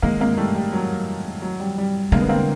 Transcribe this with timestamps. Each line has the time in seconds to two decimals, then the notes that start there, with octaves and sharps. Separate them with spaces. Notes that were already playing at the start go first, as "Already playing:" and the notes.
0.02 D#3 G#3 A#3
0.20 G#3 A#3
0.37 G3 A3
0.55 G3
0.73 F#3
1.42 F#3
1.60 G3
1.78 G3
2.12 D3 G#3 A#3
2.21 B3
2.29 A#3 C4